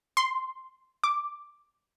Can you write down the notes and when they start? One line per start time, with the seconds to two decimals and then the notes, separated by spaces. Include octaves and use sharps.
0.17 C6
1.04 D6